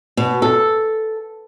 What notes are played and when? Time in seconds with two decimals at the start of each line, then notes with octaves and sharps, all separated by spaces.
0.17 B2
0.42 A4